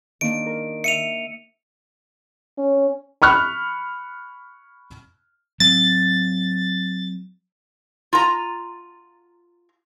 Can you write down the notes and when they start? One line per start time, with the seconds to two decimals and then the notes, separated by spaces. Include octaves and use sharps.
0.21 D#3 A#3 D4 D7
0.46 A#4
0.84 E5 C#7 D#7 F7
2.58 C#4
3.22 B5 C#6 F6 F#6
5.60 F#3 C4 A6
8.13 F4 A#5